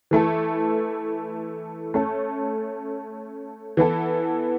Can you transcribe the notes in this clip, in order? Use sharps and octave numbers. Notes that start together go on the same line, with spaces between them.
E3 A3 E4 A4
A3 C#4 A4
E3 B3 E4 A4